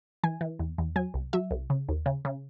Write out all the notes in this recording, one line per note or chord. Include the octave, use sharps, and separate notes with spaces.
E3 G#5
E3
E2
E2
F#3 G#5
C2
F#3 E5
C2
C#3
D#2
C#3
C#3